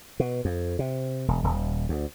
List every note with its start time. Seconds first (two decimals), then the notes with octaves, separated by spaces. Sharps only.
0.20 B2
0.45 F2
0.79 C3
1.28 E1
1.44 D#1
1.89 D2